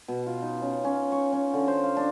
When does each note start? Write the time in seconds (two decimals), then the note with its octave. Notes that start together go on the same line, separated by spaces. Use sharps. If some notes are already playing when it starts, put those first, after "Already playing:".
0.08 B2
0.27 F4
0.42 D#4
0.62 C#4
0.85 C#4
1.12 C#6
1.33 C#4
1.53 D3
1.68 C5
1.83 F5
1.97 D4